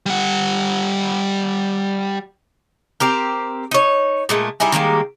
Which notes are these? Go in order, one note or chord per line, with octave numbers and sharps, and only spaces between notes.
G3 F#5
C4 G4 A#4
D#4 C#5
A#2 G#3 A3
G3 D#4 E4 G#4
D#3 G3 G#3 A#3